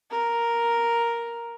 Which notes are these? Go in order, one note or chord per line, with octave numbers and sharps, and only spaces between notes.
A#4